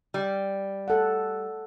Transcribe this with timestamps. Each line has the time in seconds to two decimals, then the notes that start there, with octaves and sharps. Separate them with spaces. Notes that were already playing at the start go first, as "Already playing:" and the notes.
0.14 G3
0.88 A4 F#5